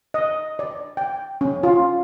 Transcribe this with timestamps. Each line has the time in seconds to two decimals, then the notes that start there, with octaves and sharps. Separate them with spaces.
0.14 D#5
0.59 D5
0.97 G5
1.41 C#4
1.63 F4